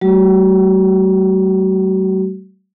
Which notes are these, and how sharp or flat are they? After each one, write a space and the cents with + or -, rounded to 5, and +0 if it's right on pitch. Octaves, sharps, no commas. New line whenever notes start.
F#3 +45 A3 -20 F#4 +35